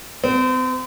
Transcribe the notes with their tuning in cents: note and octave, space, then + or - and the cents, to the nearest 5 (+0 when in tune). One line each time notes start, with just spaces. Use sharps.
C4 -40